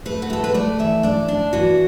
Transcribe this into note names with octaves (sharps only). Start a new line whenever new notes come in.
A3 B4
F#4
A3 A4
B4
A3 D5
E3 E5
D4 D5
D4
E3 F#4